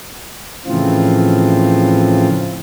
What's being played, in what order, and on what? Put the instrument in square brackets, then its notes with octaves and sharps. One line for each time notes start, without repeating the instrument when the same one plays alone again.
[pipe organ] A2 C#3 E3 F3 C4 F4